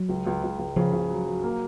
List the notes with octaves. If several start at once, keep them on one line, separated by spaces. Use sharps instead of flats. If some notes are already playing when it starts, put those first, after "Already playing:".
Already playing: F#3
C#2
C#2
C#2
C#2
C#3 F3
C#3
F#3
F#3
A#3